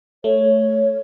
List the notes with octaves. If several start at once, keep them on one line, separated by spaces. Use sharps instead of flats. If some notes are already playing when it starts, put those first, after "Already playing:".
A3 C#5